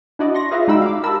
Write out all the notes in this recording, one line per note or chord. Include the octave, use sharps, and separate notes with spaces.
D4 E4 F#4 D5 D#5
C6 C#6 A#6
F4 G#4 B4 D5 E5 F5
G#3 D#4 F#4 G5 B5 E6
F5 D6
G4 A#4 A5 B5 E6